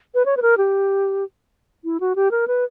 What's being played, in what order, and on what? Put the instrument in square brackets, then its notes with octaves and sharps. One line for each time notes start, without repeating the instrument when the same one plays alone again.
[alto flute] B4
C#5
B4
A#4
G4
E4
F#4
G4
A#4
B4